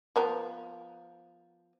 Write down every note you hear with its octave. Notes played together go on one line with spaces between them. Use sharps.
F3 B3 A#4